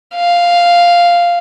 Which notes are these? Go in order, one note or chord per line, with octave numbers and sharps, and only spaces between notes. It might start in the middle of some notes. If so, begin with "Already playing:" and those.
F5